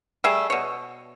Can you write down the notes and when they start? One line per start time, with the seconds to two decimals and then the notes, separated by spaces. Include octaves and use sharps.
0.24 G3 A3 G#4 E5
0.50 B2 C#5